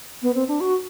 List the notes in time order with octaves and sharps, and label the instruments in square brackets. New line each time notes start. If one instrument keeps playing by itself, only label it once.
[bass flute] B3
C4
D4
F#4